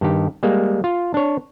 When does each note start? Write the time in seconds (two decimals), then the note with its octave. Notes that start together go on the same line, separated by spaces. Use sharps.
0.01 G2 D#3 G4
0.43 G3 G#3 A#3
0.84 F4
1.14 D4 C#5